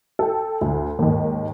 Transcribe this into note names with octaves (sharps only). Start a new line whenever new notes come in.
A4 G5
D2
D#2 G#2 D#3